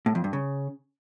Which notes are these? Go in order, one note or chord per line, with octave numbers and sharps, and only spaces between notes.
A2
F2
G2
C#3